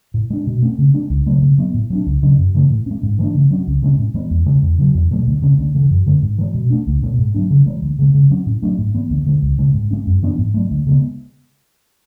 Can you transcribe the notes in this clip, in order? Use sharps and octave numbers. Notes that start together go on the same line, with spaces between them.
A2
G#3 D4
B2
A3 C#4
C#3
G#3 D4
C#2
C#3 F#3 A3
C#3
F#3 B3
A2
F#3 B3 D4
C#2
C#3 F#3 C#4
F#2
C#3 E3 A3
A2
G#3 C#4
G#2
E3 A3 D4
C#3
F#3 C#4
C#2
C#3 G#3 C#4
A2
E3 G#3 B3
E2
C#3 G#3 C#4
E2
C#3 F#3
E2
B2 F#3 A3
D2
C#3 G#3 C#4
D2
C#3 E3
F#2
D3 G#3
G#2
E3 G#3
B2
A3 D4
C#2
B2 G#3
G#2
F#3 A3 D4
C#3
E3 G#3
D2
C#3 G#3
C#3
F#3 C#4
A2
F#3 A3 D4
G#2
E3 B3
D2
D3 G#3
C#2
C#3 G#3
G#2
G#3 C#4
F#2
E3 B3 D4
G#2
F#3 A3
D2
C#3 G#3 B3